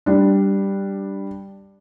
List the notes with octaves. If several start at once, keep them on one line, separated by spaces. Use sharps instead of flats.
G3 D4